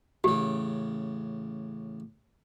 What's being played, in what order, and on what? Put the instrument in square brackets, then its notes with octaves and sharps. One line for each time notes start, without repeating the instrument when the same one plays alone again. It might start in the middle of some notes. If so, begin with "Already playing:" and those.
[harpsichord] A1 C#3 [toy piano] G4